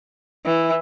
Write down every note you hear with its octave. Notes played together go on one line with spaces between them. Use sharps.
E3